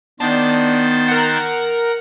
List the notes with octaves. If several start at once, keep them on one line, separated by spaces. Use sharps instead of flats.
D#3 B3 D4 C5 A6
A#4 F#5